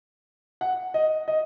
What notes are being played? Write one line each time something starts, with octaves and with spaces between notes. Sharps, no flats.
F#5
D#5
D#5